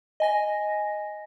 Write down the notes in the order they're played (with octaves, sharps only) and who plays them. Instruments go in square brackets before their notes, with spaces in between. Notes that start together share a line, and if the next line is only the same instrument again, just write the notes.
[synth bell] D#5 G#5 A#6